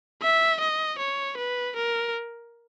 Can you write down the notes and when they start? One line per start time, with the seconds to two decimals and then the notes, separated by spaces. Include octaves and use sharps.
0.23 E5
0.61 D#5
0.99 C#5
1.38 B4
1.77 A#4